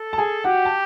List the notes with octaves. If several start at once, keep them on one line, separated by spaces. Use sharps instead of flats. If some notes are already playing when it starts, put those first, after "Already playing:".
Already playing: A4
A5
G#4 G#5
F#4 G4 F#5
A5